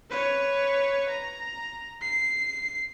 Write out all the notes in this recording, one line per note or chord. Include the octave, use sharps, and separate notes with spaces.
B4 C#5
A#5
C7